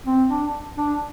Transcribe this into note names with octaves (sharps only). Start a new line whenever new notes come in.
C4
D4
D4